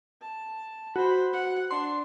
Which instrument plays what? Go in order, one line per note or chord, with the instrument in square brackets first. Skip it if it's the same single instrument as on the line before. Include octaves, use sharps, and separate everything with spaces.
[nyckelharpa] A5
[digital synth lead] F#4 [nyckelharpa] C5 B5
[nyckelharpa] F#5
[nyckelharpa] D4 [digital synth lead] C6